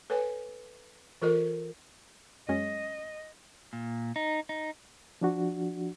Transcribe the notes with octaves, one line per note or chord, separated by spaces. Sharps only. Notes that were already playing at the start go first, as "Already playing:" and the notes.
A4 B4 C#5 G#5
E3 F4 A4 A#4 D#5
F#2 G#3 C#4 D#5
A#2
D#4
D#4
F3 D4 F#4